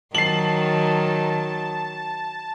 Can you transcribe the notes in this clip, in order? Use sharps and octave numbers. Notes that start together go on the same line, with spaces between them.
D#3 F#3 A5 C7 F#7